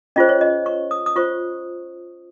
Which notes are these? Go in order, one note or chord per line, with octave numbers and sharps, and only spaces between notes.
C#4 F4 G#4 C5 D#5
C#5
D#5
C#6
D#6
D#6
F4 C5 C#6